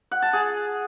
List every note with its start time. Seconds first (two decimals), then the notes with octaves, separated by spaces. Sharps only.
0.11 F#5
0.22 A5
0.33 G#4